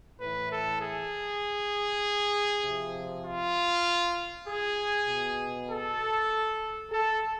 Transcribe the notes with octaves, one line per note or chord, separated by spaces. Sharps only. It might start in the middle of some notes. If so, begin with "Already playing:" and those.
A2 E3 B4
A4
G#4
C3 F3
F4
G#4
B2
A4
A4